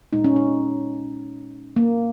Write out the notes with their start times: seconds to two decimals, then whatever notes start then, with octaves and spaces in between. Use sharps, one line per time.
0.13 A#2 G#3 D#4
0.24 C#4
0.36 D#4
1.76 A#3